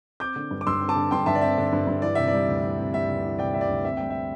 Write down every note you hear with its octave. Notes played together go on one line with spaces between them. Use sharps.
C4 D6 G6
D3
G2
D6
G2 C6 E6
C4
A5 D6
D3
G2 G5 C6
G2 E5 A5
D5
C4 E5
D3
G2
G2
E3 D5
C3 E5
D5
G3
D2
E3
C3
G3 E5
D2
E3
C3 D5 G5
G3 E5
D5
D2
C4 E5
G3 G5
E5